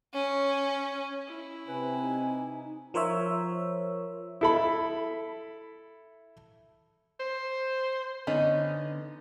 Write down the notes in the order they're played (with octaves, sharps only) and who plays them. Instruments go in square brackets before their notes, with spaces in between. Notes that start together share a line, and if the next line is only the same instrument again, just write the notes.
[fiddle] C#4
[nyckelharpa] E4
[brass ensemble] C3 [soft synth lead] B4 [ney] G#5
[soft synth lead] D#4
[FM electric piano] F3 A#4 C5 C#5 E5
[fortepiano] E4 A4 B5
[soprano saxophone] C5
[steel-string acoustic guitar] D3 [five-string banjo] B3 C#4 D#4